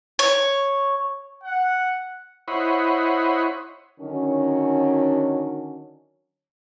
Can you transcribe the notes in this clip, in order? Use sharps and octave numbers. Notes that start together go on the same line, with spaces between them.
C#5
F#5
E4 C5 C#5 D#5 F#5 B5
D3 D#3 F#3 C#4